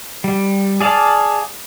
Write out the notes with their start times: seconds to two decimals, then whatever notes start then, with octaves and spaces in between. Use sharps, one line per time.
0.24 G3
0.81 G#4 D5 F5 A5